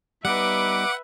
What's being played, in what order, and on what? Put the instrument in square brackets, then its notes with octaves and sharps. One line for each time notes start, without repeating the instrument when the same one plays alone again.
[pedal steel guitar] G3 B3 D#4 [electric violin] B4 E5 [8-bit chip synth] F#5 [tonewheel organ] D6